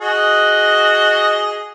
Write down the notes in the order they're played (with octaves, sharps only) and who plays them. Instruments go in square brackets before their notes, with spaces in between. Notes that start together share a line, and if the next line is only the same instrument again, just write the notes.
[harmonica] F#4 G#4 D#5